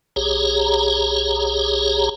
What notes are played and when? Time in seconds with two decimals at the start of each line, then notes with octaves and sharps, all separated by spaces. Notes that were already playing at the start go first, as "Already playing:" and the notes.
0.16 B1 G4 G#4 C#5 A#5